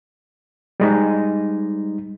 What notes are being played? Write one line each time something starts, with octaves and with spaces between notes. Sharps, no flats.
G3 G#3 D#4